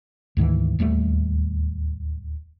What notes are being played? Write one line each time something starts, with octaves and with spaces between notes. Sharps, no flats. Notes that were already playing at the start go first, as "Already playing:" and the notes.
D2 G#2 D#3 E3
D1 D#2 G3 A3